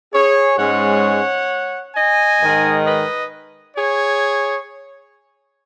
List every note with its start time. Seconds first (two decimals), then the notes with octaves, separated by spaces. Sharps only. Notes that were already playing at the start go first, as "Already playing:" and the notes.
0.14 G#4 C#5
0.58 G#2 G#3 C#4 C#5 F#5
1.95 D#5 G#5
2.41 G#2 D#3 G#3
2.86 B4 D#5
3.76 G#4 C#5